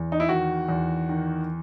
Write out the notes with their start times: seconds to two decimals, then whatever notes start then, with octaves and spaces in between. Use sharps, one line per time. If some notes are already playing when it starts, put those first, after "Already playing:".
Already playing: E2
0.12 D#4
0.20 E4
0.29 D#3 F#4
0.69 E2
1.09 D#3